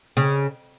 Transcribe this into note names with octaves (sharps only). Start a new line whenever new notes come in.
C#3